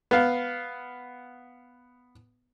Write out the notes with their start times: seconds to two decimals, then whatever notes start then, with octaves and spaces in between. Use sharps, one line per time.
0.11 B3 F5